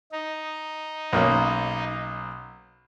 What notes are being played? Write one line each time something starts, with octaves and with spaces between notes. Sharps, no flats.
D#4
B1 A#3 C#4